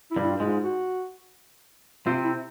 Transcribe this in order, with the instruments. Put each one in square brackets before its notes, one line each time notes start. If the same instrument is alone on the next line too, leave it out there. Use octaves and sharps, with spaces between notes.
[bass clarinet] E4
[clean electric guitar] G2 G3
[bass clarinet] E4
F4
[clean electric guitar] G#2 G#3
[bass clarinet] F4
F#4
[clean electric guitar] C3 C4 [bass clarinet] F4
[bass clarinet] E4